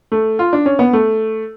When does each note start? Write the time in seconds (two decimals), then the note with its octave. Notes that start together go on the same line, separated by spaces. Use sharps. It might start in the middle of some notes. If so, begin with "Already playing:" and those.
0.12 A3
0.39 F4
0.53 D4
0.66 C#4
0.79 B3
0.93 A3